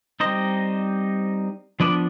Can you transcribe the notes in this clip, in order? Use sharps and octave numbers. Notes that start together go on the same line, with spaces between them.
G3 C4 D#4 C5 D#5
F3 B3 D4 B4 D5